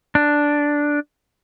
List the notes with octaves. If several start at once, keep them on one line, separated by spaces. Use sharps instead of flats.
D4